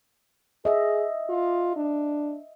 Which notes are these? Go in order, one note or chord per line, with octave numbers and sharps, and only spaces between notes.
G#4 D#5 E5
F4
D4